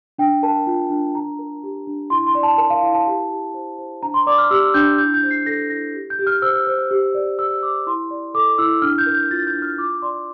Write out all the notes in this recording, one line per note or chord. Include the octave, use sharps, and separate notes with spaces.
D4 G5
A#4 A5
F4
D4
D4 A#5
A#4
G4
D4
E4 C6
C6
D5
A5
A#4 A5
F5
E4
A5
G4
G4
C5
C5
D4 A#5
C6
D5 D6
F6
G4 E6
D4 G6
E4 G6
G6
C5
C7
A4 A#6
E4 A#6
G4
G6
G4
F6
C5 E6
C5
G4
D5
A#4 E6
G4 D6
E4 C6
D5
A4 D6
E4 E6
D4 F6
G6
A#4
G6
F4 A6
G6
D4
F6
F4 D6
D5 C6